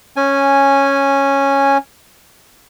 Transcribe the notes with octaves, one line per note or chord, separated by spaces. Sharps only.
C#4 G#5